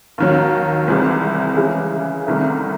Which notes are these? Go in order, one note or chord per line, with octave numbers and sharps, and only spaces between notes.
D#2 D#3 F#3
C2 C3 E3 G#3
C#3 E3 G#3
C2 C3 D#3 A3